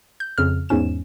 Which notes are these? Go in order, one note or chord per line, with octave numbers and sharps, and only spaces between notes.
G6
F2 C#3 F6
E2 G#2 C#4 E7